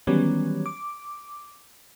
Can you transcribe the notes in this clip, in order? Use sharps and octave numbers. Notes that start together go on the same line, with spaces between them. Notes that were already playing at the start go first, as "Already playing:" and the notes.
D#3 E3 F#3 G3 B3 C#4
D6